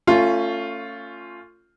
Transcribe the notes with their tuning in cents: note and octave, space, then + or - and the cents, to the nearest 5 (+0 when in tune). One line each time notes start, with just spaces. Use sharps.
A3 +30 C#4 +0 F4 +0